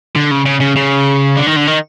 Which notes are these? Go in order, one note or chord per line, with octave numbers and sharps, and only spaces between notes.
D3
C#3
C#3
C#3
C#3
D3
D#3
D3
D#3